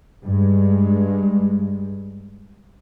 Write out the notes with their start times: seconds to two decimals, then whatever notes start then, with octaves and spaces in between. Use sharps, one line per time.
0.23 G2 G#3